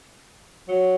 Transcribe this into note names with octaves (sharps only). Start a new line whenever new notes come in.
F#3